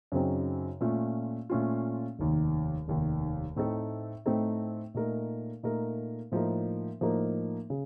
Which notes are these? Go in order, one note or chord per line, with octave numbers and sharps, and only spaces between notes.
F#2 C#3 F#3 C4 D#4
A#2 A3 C#4 F4
A#2 A3 C#4 F4
F1 D#2 D#3
F1 D#2 D#3
A2 A3 C4 D#4 A4
A2 A3 C4 D#4 A4
A#2 A3 D#4 A#4
A#2 A3 D#4 A#4
A2 F3 A#3 D#4 A#4
A2 F3 A#3 D#4 A#4
C#3